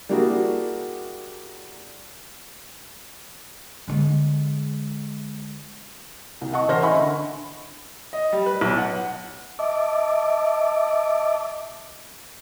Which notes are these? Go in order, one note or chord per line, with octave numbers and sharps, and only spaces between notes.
G3 A#3 D4 E4 F#4 G#4
D3 G#3
C2
D#5 F#5 A5 C#6
A1 A#4 C5 F6 A#6
D#5 E5 F#5 G#5 B5 C#6
D3 B5
D#5
G3
B4
B1
F#5
D#5 E5 A5 D6